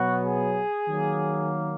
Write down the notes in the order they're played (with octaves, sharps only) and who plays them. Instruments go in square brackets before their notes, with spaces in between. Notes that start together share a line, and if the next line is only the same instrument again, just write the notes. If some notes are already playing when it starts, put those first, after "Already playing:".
Already playing: [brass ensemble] B2 F#3 B3 F#4
G#4
D#3 F#3 A#3